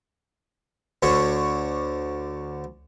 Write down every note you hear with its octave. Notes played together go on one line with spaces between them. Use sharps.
D2 D3 C#5 C#6